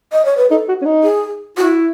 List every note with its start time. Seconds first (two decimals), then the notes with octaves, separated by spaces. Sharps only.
0.12 D#5
0.25 C#5
0.37 B4
0.50 D#4 A4
0.68 F#4
0.82 C#4
0.85 D#4
1.03 G#4
1.57 E4 F#4